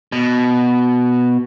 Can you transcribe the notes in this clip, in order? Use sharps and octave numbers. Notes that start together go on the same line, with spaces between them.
B2